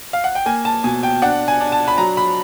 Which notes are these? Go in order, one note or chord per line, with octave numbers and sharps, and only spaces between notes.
F5
F#5
G5
A#3 G#5
A5
B2 G#5
G5
D4 F#5
G#5
D4
A5
B5
F#3 A#5
B5